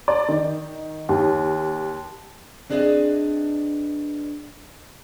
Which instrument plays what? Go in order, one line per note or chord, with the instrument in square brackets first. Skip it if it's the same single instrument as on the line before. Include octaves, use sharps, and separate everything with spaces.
[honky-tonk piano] D5
D#3
D#2
[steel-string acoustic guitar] C4 D4 G#4 B4 D#5 E5